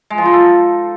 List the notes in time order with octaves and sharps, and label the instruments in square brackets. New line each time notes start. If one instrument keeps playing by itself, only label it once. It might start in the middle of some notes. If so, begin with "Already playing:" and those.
[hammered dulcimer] G#3
F3
D#4
A4